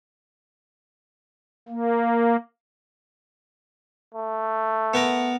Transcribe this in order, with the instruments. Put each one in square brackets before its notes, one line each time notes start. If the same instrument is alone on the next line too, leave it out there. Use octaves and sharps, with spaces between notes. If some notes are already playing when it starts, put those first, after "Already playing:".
[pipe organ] A#3
[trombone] A3
[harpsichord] B3 A#4